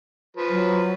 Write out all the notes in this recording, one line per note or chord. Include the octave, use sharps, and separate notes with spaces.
F3 B4
F#3